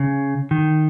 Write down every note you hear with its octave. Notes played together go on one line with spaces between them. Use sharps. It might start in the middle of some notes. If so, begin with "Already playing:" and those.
Already playing: C#3
D#3